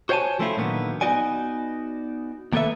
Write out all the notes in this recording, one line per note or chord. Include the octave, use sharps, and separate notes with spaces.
F#4 C5 C#5 F#5 G#5 A5
F3 A3 C4 C#4 E4 F4
A#2 D3 D#3 F#3 B3
B3 D#4 F#4 D5 G#5
D#2 A#3 B3 A4 B4 E5